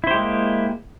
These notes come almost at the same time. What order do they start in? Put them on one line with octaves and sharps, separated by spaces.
E4 C5 G4 G#3 A#3